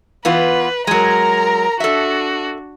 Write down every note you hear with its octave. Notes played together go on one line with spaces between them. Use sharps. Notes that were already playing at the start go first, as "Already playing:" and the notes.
E3 B3 F4 B4
F#3 G#3 A#4 A#5
D4 F#4 A4 E5